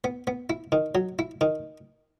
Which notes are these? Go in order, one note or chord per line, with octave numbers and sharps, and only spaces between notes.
B3
B3
E4
D#3
F#3
E4
D#3